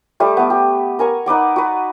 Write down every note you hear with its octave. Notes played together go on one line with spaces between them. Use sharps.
G3 A3
A3 B3
G4
A#4 G#5 C#6
D#4 B4 D5 F#5
F#4 B4